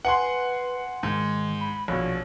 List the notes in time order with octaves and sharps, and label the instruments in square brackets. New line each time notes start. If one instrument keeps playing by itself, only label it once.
[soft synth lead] B4 [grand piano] F#5 G#5 C6
[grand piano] G#2 [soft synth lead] D#3
[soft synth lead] B5
[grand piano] A#1 B2 [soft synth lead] C#5